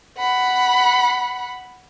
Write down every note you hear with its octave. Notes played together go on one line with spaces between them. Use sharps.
F#5 B5